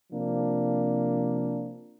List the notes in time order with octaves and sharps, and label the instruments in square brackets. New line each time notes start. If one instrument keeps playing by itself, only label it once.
[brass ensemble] C3 F3 A#3 D4